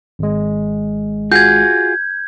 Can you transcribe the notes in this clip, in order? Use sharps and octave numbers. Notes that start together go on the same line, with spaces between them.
G#1 G#3
F4 F#4 G#4 G6 G#6